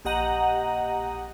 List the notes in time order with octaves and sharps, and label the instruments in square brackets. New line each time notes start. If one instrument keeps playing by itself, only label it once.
[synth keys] A#1 G4 D#5 F#5 A#5